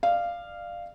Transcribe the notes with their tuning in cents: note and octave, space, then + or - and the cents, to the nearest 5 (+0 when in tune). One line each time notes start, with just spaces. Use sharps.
D5 +30 F5 -10